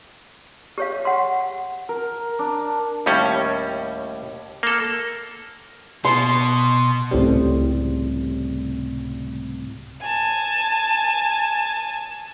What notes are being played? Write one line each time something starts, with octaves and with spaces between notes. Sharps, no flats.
G4 C#5 F5
F#5 C6
A#4
D4
D#2 A2 G3 C#4
A#3 A4
B2 C6
C#2 A2 C3 G3
G#5 A5